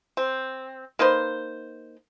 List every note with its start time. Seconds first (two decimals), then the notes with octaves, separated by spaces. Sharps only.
0.17 C4
0.99 A#3 D#4 B4 C5